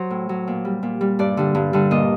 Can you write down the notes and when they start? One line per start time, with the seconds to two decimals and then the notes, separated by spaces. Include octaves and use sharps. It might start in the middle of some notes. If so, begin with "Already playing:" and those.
Already playing: F#3 C5
0.10 A2
0.29 F#3
0.47 A#2
0.65 G3
0.83 A#2
1.01 G3
1.19 G2 D5
1.37 D3 G3
1.55 G2
1.73 D3 G3
1.91 A#2 D#5